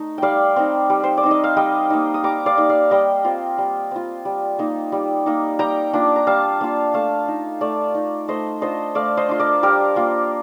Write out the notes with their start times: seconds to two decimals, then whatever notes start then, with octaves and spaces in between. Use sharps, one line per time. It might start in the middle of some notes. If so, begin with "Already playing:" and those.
Already playing: A3 D#4
0.18 G3 D5 F5 G5
0.56 C4 D#4
0.90 G3
1.04 C5
1.17 D5
1.24 C4 D#4
1.31 D#5
1.44 F5
1.56 G3 D#5 G5
1.90 A#3 D#4
2.14 D#6
2.23 G3 A#5 D6
2.46 D5 F5
2.58 A#3 D#4
2.69 D5 F5
2.91 G3 D#5 G5
3.24 C4 F4
3.58 G3
3.91 C4 F4
4.25 G3
4.59 A#3 D#4
4.92 G3
5.26 A#3 D#4
5.59 G3 G5 A#5
5.93 A#3 D4 F4
6.16 A#5
6.27 G3 F5 A5
6.61 A#3 D4 F4
6.94 A3 F5 A5
7.28 D#4
7.60 A3 D5 F5
7.95 D#4
8.28 A3 C5 D#5
8.61 D4 F4 C5 D#5
8.95 A3 D5 F5
9.17 C5 D#5
9.29 D4 F4
9.39 A#4 D5
9.63 G3 G4 A#4
9.96 A#3 F4